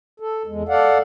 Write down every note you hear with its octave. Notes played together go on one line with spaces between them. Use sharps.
A4
E2 G#3
A4 D5 F5 F#5